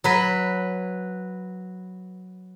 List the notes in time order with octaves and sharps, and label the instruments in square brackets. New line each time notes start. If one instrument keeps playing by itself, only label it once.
[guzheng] F#3 B4